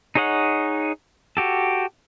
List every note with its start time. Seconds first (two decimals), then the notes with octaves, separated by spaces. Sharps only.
0.15 D#4 G#4 C#5 D#5 F#5
1.37 F#4 G4 A4